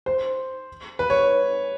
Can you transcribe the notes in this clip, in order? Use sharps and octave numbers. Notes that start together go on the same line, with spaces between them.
C5
B4
C#5